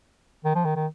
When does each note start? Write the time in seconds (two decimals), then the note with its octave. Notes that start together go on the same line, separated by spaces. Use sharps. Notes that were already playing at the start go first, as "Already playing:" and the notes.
0.45 D#3
0.55 F3
0.65 D#3
0.76 D#3